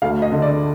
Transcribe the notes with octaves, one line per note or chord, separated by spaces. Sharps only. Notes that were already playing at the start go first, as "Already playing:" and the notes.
D2 F5
D#5
D3
D5